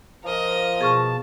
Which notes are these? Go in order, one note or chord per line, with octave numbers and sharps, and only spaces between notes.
F3 A#4 D#5
B2 G#4 A5 C#6 F6